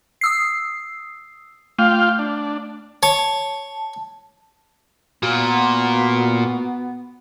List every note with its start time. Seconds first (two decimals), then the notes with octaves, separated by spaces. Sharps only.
0.21 D#6 E6 C7
1.79 A3 F4 F5 G5
2.19 D4
3.03 C#5 A5
5.23 A#2 B3 F#4